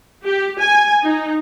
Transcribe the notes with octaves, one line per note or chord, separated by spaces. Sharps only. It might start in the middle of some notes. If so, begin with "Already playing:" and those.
G4
G#5
D#4